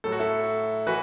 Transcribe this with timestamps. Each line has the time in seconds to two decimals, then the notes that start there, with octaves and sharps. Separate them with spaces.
0.04 A2 F#3 A4
0.12 F#4
0.19 E4 A4
0.87 E3 F#4 B4